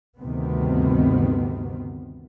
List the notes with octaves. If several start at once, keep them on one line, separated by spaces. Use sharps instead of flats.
D2 G2 C3 D#3 B3 C4